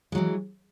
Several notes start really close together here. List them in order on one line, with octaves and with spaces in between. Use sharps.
G#3 F#3 E3